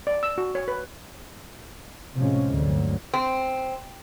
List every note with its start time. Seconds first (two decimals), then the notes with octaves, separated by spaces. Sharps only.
0.07 D5
0.23 E6
0.38 F#4
0.55 C#5
0.68 B4
2.16 A2 C3 F3 G#3 C#4
2.53 D2 G2 F#3
3.14 C4